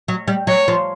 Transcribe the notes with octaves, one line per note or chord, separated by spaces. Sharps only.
F#3
G3
F#3 C#5
F3